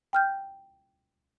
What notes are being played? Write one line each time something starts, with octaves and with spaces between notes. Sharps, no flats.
G5 F6 G6